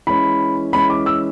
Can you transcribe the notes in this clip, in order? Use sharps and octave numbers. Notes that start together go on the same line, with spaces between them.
E3 G#3 C#4 B5
E3 G#3 C#4 B5
D6
E6